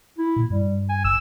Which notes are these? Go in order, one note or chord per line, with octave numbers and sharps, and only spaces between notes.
E4
A#2
G2 G3
G#5
G1 E6